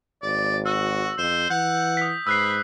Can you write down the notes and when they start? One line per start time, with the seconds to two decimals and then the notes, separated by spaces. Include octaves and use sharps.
0.23 G#1 D5
0.66 F#4 E6
1.18 F2 C5
1.50 E3 F#5 G6
1.97 D#6 B6
2.27 G#2 B4 E6 F#6 C7